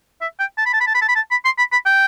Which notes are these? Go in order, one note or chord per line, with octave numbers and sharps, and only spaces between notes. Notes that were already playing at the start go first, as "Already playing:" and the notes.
E5
G5
A5
B5
A5
B5
A5
B5
A5
B5
A5
B5
C6
B5
B5
G5